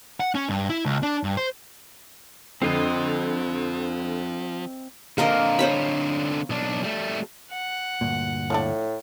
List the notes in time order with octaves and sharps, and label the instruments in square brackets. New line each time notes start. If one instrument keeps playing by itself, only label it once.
[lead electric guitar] F#5
C#4
G2
E4
C#2
D4
G2
C5
[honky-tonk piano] F2 D3 C7 [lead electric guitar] F3 [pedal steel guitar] C4 D#5
[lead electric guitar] D3 C4 [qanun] A#3 A#4 D#5
[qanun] C5 C#5 B5
[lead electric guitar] B1 D4
G3 A3
[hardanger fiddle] F#5
[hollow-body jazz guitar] D2 G2 A#2
[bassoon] A2 [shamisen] F3 A3 D4